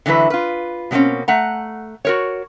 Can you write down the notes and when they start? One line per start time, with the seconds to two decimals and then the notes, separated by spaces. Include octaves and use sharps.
0.06 D3 E3 F#3 E4 B4
0.30 F4 B4
0.91 B2 F#3 A#3 C4 C#4
1.28 A3 F#5 A#5
2.05 F#4 A#4 C#5